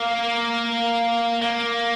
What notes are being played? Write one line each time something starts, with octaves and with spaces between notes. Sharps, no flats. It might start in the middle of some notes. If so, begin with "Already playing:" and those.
Already playing: A#3
A#3